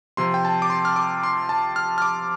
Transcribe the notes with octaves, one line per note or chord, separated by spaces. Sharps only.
C3 F3 C4 C6
G5
A5
D6
C6
F6
D6
C6
A5
F6
F6
D6